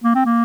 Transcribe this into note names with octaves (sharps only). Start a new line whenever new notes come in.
A#3
C4
A#3